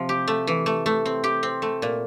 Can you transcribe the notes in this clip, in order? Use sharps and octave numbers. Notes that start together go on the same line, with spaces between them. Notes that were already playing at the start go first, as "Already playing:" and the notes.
Already playing: C3 F3
G4
A3
E3
A3
A3
C4
G4
C4
A3
A#2